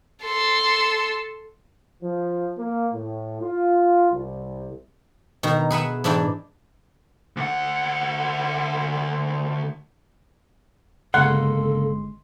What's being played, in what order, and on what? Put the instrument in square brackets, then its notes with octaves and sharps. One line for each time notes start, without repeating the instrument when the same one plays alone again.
[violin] A4 C6
[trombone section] F3
A#3
A2
F4
C2
[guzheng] B2 D#3 A#5
G#4 B4 E5 F#5
G#2 E3 D4 E4 D5 G5
[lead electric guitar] D2 F#5
[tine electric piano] G1 G#3 C6 [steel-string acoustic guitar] C#3 A#3 [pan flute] A4 [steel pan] F#5